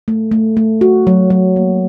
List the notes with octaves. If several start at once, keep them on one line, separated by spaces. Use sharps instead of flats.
A3
A3
A3
F#4
F#3
F#3
A#3